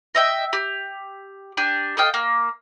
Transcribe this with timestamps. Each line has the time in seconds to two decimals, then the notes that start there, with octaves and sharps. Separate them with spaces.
0.15 D#5 E5 G5
0.53 G4
1.57 D4 G4 G#5
1.97 A4 D#5 F5 G5
2.14 A#3